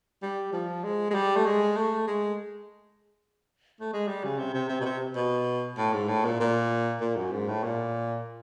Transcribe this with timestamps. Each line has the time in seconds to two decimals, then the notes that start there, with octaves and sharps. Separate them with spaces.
0.22 G3
0.53 F3
0.84 G#3
1.10 G#3
1.14 G3
1.36 A3
1.46 G#3
1.76 A3
2.07 G#3
3.81 A3
3.93 G#3
4.08 G3
4.24 C#3
4.38 C3
4.54 C3
4.69 C3
4.81 B2
4.85 C3
5.16 B2
5.78 A2
5.93 G#2
6.08 A2
6.25 A#2
6.40 A#2
7.01 A#2
7.17 F#2
7.32 G#2
7.48 A2
7.63 A#2